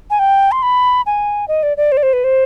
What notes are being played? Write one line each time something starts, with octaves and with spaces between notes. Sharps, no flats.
G#5
G5
C6
B5
G#5
D#5
D5
D5
C5
D5
C5
B4
C5